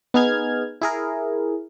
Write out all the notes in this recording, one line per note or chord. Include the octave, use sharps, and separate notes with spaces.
B3 D#4 G#4 F6 G#6
E4 G#4 A#4